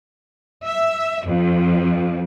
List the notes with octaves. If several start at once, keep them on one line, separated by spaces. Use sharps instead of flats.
E5
F2